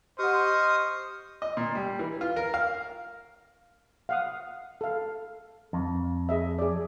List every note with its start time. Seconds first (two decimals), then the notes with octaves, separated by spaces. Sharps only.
0.19 G4 C5 D#5 F#5 C#6 D#6 F6
1.42 D#5
1.57 A#2
1.75 G3
1.99 E3
2.21 F4
2.36 A#4
2.54 F5
4.09 F5 F#5 D#6
4.81 A4 F5
5.73 F2
6.29 G#4 D#5 E5
6.59 G#4 D5